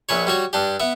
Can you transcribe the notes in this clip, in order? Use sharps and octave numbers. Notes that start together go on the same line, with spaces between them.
A#1 A#2 B4 C#5
G3 F#4 C#5
G2 D4 G4
B3 E5